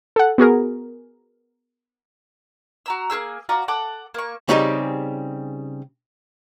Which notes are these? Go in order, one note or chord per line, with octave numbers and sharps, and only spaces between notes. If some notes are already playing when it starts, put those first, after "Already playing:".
A4 F#5
B3 F#4 G#4 A#4
F#4 A#5 E6
A#3 G4 G#4 E6
F4 F#4 D5 A#5
A4 F#5 D6
A#3 C#6
C#3 G3 C4 D#4 G4 G#4